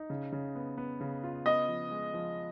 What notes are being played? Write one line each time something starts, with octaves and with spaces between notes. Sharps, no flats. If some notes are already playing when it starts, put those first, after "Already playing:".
Already playing: D#4
C#3
C#3
B3
B3
C#3
F4
B3 D#5
F3
G#3
F3